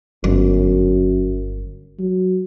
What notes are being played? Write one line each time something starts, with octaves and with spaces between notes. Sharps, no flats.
G1 F#2
F#3